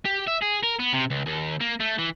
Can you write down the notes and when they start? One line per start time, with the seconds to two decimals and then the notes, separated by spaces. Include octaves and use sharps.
0.06 G4
0.28 E5
0.43 G#4
0.63 A#4
0.80 B3
0.93 C3
1.10 C#2
1.26 D#2
1.60 A#3
1.80 A3
1.98 E3